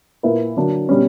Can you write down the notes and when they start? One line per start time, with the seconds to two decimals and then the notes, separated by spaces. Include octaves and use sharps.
0.23 A#2 A#3 E4 B4
0.56 D3 F#3 A#3 D4
0.89 B2 G3 C#4